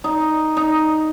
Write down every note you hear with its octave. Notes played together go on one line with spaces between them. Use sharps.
D#4 D#5
D#4